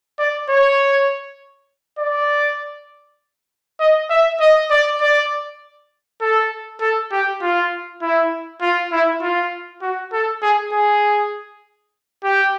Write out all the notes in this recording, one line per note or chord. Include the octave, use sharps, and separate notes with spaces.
D5
C#5
D5
D#5
E5
D#5
D5
D5
A4
A4
G4
F4
E4
F4
E4
F4
F#4
A4
G#4
G#4
G4